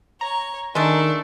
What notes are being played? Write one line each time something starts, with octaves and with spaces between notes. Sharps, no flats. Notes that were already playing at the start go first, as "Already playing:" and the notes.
C#5 A#5
D#3 G#3 A3 D4